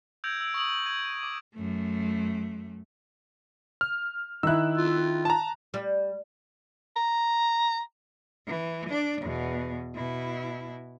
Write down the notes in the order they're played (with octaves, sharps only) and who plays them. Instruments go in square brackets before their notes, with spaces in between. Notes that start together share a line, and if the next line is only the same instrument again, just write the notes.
[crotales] E6 G6 G#6 A#6 D7 F7
E6 D7
C#6 D#6 F#7
G#6 D#7
D6
[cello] F#2 A3
[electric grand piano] F6
[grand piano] D#3 E4 [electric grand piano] E6 F#6
[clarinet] F4
[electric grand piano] A5 A#5
[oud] G3
[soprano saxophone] A#5
[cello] E3
D4 D5
E2 B2
B2 E4